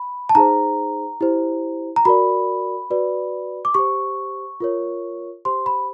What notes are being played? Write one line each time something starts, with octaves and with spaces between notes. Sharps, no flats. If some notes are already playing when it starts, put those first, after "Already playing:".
Already playing: B5
A5
D#4 G#4 C5 A#5
E4 G4 C5
A#5
F#4 A#4 D5 B5
F#4 B4 D5
D6
G4 C5 C#6
F4 A#4 C#5
G4 C5 C6
B5